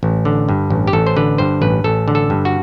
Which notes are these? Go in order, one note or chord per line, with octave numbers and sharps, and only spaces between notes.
A1
D3
G2
A1
G4
A1 A4
C5
D3 B4
G2 C5
A1 B4
A1 A4
D3
A4
G2
F#4